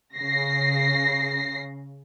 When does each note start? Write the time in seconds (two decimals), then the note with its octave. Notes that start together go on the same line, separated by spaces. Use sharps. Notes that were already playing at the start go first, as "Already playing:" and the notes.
0.15 C#3 A#6 C7